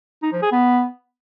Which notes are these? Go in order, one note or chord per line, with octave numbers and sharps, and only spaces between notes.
D#4
F3
G#4
B3